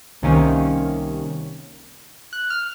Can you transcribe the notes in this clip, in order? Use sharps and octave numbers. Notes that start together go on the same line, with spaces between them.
C2 C3 D#3 A#3 C#4
F#6
F6